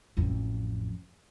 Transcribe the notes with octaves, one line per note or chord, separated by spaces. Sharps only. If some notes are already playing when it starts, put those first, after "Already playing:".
A1 F2